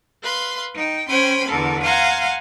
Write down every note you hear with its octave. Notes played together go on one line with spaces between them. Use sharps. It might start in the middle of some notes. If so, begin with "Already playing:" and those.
B4 F5 C6
D#4 G5
C#4 C5 G5 G#5 B5 C6
E2 D3 A4 A#4
F5 F#5 G#5 A#5 C6